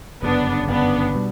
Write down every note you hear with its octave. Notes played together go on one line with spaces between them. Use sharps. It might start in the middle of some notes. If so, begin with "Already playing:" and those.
G1 F#2 C#3 B3 D4
G1 F#2 C#3 B3 D4
B2 G3